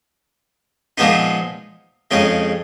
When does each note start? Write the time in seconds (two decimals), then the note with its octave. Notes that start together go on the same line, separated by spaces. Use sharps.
0.98 A#2 F3 G#3 B3 D#4
2.11 F2 C#3 G#3 D#4